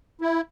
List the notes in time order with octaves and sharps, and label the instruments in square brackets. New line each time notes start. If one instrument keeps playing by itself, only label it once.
[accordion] E4